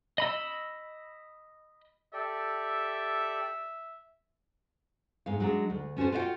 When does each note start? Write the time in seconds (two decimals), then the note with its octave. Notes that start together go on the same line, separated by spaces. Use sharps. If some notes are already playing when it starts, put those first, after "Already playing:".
0.18 D#5 B5 E6
2.13 G4 A4 D5 E5
5.26 G#2 G#3 F5
5.40 F#3 G#3 D4
5.70 D2
5.97 B3 C#4 F#4 A4 C5
6.12 F4 F#4 D5 E5 F#5 G5